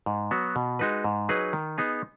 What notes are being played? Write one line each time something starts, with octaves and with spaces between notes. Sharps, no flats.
G#2
F#3 B3 F#4
B2
G#3 D#4 F#4 B4
G#2
F#3 D#4 G#4 B4
D#3
B3 D#4 G#4